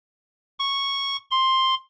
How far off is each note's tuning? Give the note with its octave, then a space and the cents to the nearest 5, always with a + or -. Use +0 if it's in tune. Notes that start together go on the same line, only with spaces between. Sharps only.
C#6 -5
C6 +5